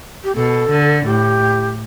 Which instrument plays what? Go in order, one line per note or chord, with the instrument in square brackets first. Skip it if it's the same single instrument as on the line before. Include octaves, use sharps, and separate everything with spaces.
[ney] G4
[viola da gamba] B2 [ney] A4
[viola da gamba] D3
[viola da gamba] A2 [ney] G4